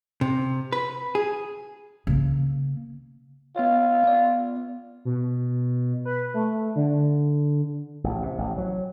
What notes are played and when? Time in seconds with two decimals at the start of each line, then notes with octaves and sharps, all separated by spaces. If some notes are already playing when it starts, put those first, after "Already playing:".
0.21 C3
0.72 B4
1.15 G#4
2.07 C#3 A#3
3.56 B3 F4 C#5
4.04 B3 D5
5.05 B2
6.05 B4
6.34 A3
6.76 D3
8.04 A1
8.23 C3
8.38 A1
8.58 F#3